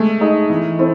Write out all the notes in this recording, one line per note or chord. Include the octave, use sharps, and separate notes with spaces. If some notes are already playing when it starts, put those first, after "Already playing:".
Already playing: G#3 A3
D#4 G#4 D#5
E3
C4 E4 A4